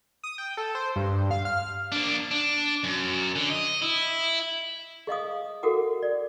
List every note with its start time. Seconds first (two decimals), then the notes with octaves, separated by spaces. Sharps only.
0.24 D#6
0.38 G5
0.57 A4
0.75 C5
0.96 G2
1.31 F5
1.45 F6
1.92 A#3 D4
2.31 D4
2.84 F#2
3.36 D3
3.50 D#5
3.82 E4
5.07 G#4 D#5 F5 D#6
5.63 F#4 A4 A#4 F#5 D6
6.03 D5